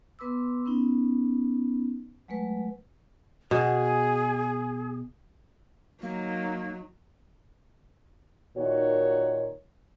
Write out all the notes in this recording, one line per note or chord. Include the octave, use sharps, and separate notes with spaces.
B3 B4 C6 D6 E6
B3 C#4 D#4
F#3 G#3 A3 B4
B2 G#4
F#3 A#3 D#4
A#2 D#3 D#4 F#4 C#5